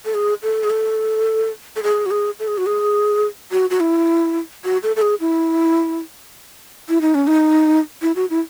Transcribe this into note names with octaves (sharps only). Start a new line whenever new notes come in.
A4
G#4
A4
G#4
A4
A4
G#4
F#4
G#4
A4
G#4
F#4
G#4
F#4
F#4
E4
F#4
A4
A4
G#4
E4
E4
D#4
C#4
D#4
E4
F#4
E4